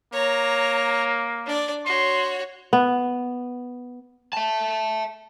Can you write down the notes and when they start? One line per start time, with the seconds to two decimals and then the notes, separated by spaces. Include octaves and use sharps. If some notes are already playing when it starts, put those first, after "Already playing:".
0.13 A#3 C#5 A#5
1.46 D4 D5
1.86 F#4 C#5 C6
2.73 B3
4.33 E5 A5